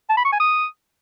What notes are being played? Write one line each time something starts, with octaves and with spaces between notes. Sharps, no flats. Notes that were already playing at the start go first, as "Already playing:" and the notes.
A5
B5
C#6
G#5
D#6